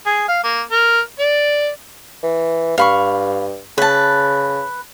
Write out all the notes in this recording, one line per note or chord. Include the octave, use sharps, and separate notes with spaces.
G#4
F5
A#3
A#4
D5
E3
G2 F5 B5 C#6
C#3 B4 A5